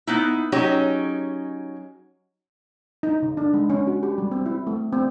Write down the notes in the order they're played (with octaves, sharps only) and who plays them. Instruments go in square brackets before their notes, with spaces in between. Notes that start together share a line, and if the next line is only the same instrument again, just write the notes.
[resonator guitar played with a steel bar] B3 D#4 E4
F#3 C#4 D#4 G4 G#4
[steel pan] D#4
C#3
D4
G#3
C#4
F#4
G4
G3
C4
E4
A3
C4